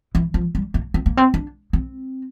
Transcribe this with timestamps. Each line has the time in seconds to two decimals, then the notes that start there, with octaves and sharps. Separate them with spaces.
0.15 E3
0.34 F3
0.55 G3
0.74 A#3
0.94 C4
1.06 A#3
1.17 C4
1.34 D4
1.73 C4